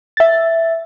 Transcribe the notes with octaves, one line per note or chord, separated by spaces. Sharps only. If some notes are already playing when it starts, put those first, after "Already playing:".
E5 A6